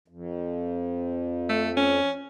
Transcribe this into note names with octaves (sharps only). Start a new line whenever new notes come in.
F2
A3
C#4